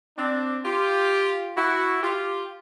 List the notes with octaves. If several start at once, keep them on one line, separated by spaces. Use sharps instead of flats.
C4 D4
F4 G4
E4 F#4
F4 G4